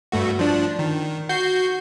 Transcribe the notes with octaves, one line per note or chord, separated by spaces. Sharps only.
G2 A3 F#4
F3 D4
D#3
F#4 G6 C7